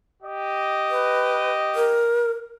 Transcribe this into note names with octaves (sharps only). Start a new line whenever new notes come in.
G4 D#5
B4
A#4